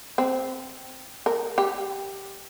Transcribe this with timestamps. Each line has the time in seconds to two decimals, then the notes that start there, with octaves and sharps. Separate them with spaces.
0.18 C4
1.26 A#4
1.58 G4